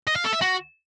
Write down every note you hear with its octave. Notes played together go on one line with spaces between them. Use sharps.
D#5
F5
A4
E5
F#4